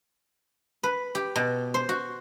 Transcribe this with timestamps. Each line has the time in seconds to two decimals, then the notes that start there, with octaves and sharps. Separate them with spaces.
0.83 B4
1.15 G4
1.36 B2
1.74 C5
1.89 F#4